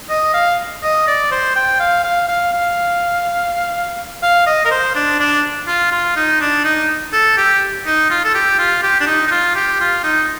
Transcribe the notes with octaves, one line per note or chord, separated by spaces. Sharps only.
D#5
F5
D#5
D5
C5
G5
F5
F5
F5
F5
F5
D#5
A#4
C5
D4
D4
F4
F4
D#4
D4
D#4
A4
G4
D#4
F4
A4
G4
F4
G4
D4
D#4
D#4
F4
G4
F4
D#4